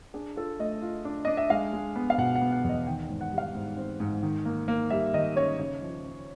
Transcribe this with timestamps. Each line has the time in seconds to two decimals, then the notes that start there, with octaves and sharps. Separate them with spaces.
0.14 D4 G#4
0.36 F4 A4
0.59 A3 D#5
0.82 F4
1.05 D4
1.25 D4 D#5
1.37 E5
1.50 G#3 F5
1.73 G#3
1.96 B3
2.10 F5
2.18 B2 F#5
2.36 F#5
2.41 B3
2.52 F#5
2.64 E2 D#5
2.87 D#3 G5
3.10 G#2
3.21 F#5
3.32 G3
3.38 F5
3.55 G#2
3.77 C4
4.00 G#2
4.23 D#3
4.45 A#3
4.68 A#3
4.91 G3 E5
5.14 D#3 D#5
5.36 C#4 C#5
5.58 C#3 C#5
5.82 F3
6.05 C#4